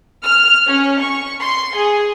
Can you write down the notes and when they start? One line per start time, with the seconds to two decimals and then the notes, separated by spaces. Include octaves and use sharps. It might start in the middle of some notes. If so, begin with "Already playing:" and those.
0.24 F6
0.67 C#4
1.00 C#6
1.41 C6
1.76 G#4